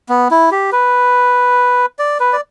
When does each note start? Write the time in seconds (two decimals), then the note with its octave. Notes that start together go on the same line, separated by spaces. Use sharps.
0.09 B3
0.31 E4
0.51 G4
0.72 B4
1.99 D5
2.20 B4
2.33 D5